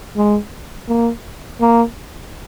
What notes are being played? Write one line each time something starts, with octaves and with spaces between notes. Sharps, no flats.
G#3
A#3
A#3